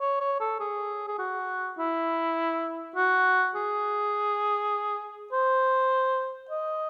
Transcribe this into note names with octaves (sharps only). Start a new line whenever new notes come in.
C#5
C#5
A4
G#4
G#4
F#4
E4
F#4
G#4
C5
D#5